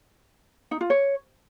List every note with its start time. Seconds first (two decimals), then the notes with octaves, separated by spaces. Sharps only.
0.71 D#4
0.81 F4
0.90 C#5